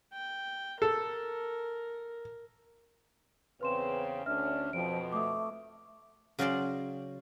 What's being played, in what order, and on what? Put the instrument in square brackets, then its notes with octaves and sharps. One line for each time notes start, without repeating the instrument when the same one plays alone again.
[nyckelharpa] G5
[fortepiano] A4 [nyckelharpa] A#4
[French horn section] E2 C#3 C4 [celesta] B4 C6 E7
[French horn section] D2 C#4 D4 [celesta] E5 F6
[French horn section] F2 B2 C4 [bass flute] F3 [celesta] D7
[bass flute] A3 [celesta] D6 D#6
[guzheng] C#3 F#3 C#4 C5 D5 C6